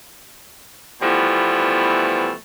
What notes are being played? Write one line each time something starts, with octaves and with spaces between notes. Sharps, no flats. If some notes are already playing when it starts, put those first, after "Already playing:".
B2 E3 F3 G3 A3 B3